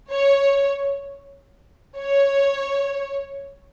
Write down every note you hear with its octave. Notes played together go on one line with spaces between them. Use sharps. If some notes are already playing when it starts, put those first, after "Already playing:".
C#5
C#5